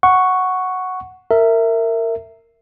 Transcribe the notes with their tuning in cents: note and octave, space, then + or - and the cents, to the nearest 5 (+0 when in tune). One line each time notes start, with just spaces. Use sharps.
F#5 +0 C#6 +0
A#4 -25 E5 +0